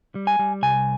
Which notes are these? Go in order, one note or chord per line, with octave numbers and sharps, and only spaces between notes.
G3
G#5
G3
C2 G#5